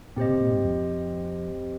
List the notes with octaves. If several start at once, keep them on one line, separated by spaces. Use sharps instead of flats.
A#2 C4 G4 C5 D#5
C3
A#2
G#2
F2